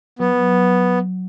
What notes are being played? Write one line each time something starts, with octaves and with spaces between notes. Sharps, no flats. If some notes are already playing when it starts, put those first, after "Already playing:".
F#3 B3